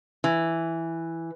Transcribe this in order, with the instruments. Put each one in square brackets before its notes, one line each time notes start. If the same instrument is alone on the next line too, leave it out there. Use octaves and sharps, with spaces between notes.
[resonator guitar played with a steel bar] E3